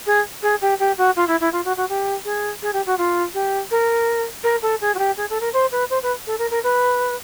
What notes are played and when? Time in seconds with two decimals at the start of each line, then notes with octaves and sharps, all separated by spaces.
0.06 G#4
0.42 G#4
0.61 G4
0.79 G4
0.98 F#4
1.16 F4
1.27 E4
1.40 E4
1.52 F4
1.65 F#4
1.77 F#4
1.89 G4
2.25 G#4
2.62 G#4
2.73 G4
2.86 F#4
2.98 F4
3.34 G4
3.71 A#4
4.43 A#4
4.62 A4
4.81 G#4
4.95 F#4
4.99 G4
5.17 G#4
5.30 A4
5.41 A#4
5.53 C5
5.72 B4
5.90 C5
6.03 B4
6.27 A4
6.39 A#4
6.51 A#4
6.63 B4